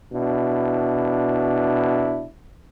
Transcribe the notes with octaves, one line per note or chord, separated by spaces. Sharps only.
B2 D4 E4